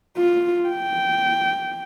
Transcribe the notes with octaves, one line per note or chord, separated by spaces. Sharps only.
F4
G5